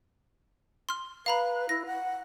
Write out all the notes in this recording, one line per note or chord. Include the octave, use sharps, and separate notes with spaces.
C6 F6
B4 F5 A#5 B5
E4 A#6
F#5